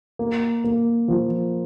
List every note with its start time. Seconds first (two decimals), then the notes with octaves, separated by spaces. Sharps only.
0.19 A#3
0.64 A#3
1.08 F3